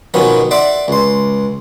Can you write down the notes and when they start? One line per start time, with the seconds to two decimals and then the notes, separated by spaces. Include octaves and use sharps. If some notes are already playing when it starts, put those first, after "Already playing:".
0.14 B2 D#3 F3 B3 C#4
0.51 D5 E5 F#5 C6 D6
0.88 C#2 C6